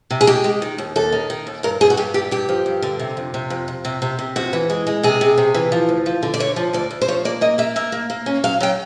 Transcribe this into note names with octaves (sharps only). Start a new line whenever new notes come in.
C3
G#4
G#3 G4
G#3
D#3
D#2
D#2 A4
D#3
D#3
D#2
G2 A#4
G2 G#4
F#4
G2 G4
D3 G4
G2 G4
F3
G2
D3
C3
F2
C3
F2
F2
C3
C3
C3
F2 F#4
E3
G#3
G#3
C3 G#4
C3
C3
E3
F3
D2
F3
D3
D5
D2 C#5
F3
D2 D5
D2
C5
F3 C#5
A#3 D5
A#3 D#5
A#3 E5
A#3 E5
A#3
A#3
C#4
F#3 F5
F#3 G5